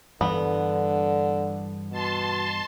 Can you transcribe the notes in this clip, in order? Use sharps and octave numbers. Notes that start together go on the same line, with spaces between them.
G2 D3 E3 G3 B3
B2 A5 C6